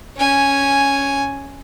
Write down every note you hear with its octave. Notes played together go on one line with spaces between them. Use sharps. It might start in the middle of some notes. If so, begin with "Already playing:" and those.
C#4 G#5